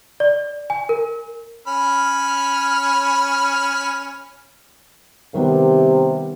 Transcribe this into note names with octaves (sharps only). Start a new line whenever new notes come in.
D5
G#5
A#4
C#4 B5 F6
C3 D#3 G3 B3